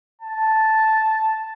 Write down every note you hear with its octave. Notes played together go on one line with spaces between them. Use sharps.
A5